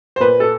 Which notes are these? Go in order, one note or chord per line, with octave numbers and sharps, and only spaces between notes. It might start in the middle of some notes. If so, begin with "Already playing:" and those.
C5
A#2 B4
A4